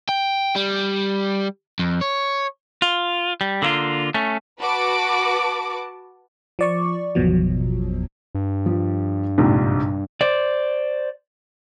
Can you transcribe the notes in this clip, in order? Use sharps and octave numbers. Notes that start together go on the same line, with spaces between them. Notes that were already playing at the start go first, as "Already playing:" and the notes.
G5
G3
F2
C#5
F4
G3
D3 A#3 E4 F4
A3 C#4
F#4 B4 A5 D6
F3 D5 C#6
G#1 E2 B2 F3 F#3
G2
F3
A#1 G#2 C3
C5 D5